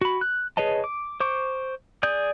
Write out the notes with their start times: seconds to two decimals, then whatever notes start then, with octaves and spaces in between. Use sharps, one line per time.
0.01 F#4 B5
0.21 F#6
0.57 G#4 B4 C#5 D#5 A5
0.84 D6
1.20 C5 C#6 D6
2.03 G#4 D5 D#6 G6